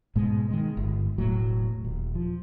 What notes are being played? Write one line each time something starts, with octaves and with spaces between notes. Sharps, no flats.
G#2 B2 G#3
D#3 G#3
G1
E1 A2 F#3
D#1
F3